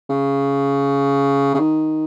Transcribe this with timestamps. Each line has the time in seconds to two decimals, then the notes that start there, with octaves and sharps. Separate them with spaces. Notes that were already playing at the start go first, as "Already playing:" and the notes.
0.09 C#3
1.54 C#3
1.59 D#3